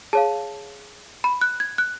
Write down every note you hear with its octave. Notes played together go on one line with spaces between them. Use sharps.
G#4 C#5 F5 A5
B5
F#6
G#6
F#6